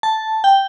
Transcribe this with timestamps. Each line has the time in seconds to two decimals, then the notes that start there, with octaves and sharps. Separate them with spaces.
0.03 A5
0.44 G5